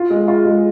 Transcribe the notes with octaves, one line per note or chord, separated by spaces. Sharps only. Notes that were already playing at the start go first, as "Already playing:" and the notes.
Already playing: F4
G#3
F4
G#3